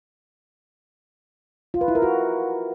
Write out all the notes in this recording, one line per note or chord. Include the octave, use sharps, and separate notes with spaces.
F4
B4
E4
A#4
F#4